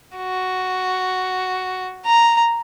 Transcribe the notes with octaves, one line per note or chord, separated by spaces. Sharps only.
F#4
A#5